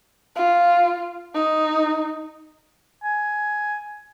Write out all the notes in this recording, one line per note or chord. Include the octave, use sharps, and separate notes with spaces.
F4
D#4
G#5